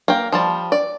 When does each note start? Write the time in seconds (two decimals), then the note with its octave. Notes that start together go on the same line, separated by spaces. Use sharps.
0.08 A#3 G5
0.32 F3 G3 A5
0.72 D5